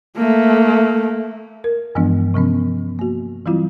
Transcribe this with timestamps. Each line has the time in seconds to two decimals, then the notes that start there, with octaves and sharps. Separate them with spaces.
0.16 A3 A#3
1.64 A#4
1.95 G2 E3 F3 G#3 B3 D4
2.34 C3 F3 B3 C#4
2.99 A#3 F#4
3.46 E3 F#3 G3 C4 E4 F4